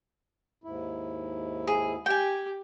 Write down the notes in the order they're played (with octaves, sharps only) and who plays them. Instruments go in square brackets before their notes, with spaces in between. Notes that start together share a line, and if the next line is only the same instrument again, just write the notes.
[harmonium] D#2 G#2 E4
[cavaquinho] G#4
[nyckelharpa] G4 [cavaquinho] G5 G#5